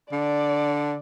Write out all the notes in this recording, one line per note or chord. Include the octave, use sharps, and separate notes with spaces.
D3 D5